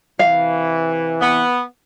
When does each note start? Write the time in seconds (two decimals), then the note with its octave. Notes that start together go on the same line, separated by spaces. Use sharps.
0.19 C3 E3 F5
1.21 B3